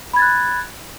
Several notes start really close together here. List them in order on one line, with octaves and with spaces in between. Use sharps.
B5 G#6 A6 F#6